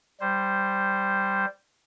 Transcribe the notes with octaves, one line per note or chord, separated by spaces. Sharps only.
G3 C5